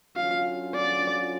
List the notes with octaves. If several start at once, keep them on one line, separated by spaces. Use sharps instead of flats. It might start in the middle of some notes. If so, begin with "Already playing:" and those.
D3 F#3 C#4 F4 F5
D5